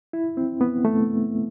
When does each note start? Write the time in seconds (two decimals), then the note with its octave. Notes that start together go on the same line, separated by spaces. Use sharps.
0.13 E4
0.37 C4
0.61 B3
0.85 A3